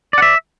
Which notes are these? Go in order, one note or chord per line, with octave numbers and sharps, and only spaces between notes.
D5 E5 F#5